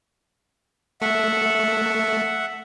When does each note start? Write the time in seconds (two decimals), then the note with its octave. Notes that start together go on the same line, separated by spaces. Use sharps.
1.01 A3 E5 F#5